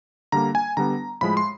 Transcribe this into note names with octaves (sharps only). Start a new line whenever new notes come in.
D3 G3 A#3 A#5
G#5
D3 G3 B3 A#5
A2 F3 G#3 B5
C6